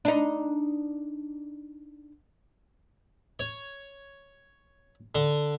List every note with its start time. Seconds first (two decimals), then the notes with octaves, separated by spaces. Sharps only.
0.05 D4 D#4
3.39 C#5
5.15 D3